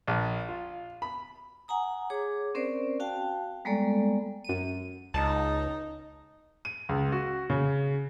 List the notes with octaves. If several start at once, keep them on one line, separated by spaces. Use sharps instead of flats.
A#1
F4
B5
F#5 G#5 A#5 D#6
G#4 C#5 D6
C4 C#4 A#4 C5 D5
F#4 F5 G5 A5
G3 G#3 A#3 B3 A4 D5
F#2 D#7
C#2 D#4 A5
D#7
C#2
F#4
C#3